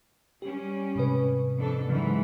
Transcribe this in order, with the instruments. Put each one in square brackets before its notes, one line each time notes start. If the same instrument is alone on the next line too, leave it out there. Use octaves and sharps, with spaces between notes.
[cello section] G3 C#4 [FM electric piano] G4
[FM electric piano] G#2 C3 B4
[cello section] F2 D4 A4
[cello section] G#2 E3 [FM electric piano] C#3 F#3